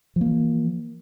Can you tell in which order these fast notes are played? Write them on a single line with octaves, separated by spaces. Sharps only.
F3 A#3 E3